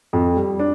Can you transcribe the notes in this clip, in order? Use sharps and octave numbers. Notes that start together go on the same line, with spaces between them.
F2
G3
D4